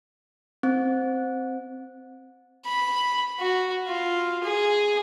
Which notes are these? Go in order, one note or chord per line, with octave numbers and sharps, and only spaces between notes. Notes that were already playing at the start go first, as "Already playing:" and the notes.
C4
B5
F#4
F4
G#4